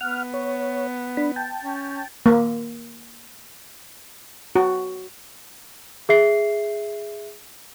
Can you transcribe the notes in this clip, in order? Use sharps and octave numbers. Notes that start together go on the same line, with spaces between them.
B3 F#5 F6
C#5
D4 B5
G5 A5
C#4
A#3
F#4
G#4 E5 C7